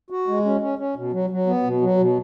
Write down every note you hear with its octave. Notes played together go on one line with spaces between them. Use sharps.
F#4
G#3
C#4
C#4
C#4
B2
F#3
F#3
B3
B2
F#3
B2